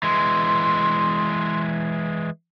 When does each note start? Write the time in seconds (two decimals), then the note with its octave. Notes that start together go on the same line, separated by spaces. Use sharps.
0.03 E3 G#3 C6